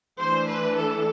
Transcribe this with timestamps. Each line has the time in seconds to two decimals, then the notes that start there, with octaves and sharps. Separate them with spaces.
0.18 E3 A3 D4 C5
0.47 B4
0.75 A4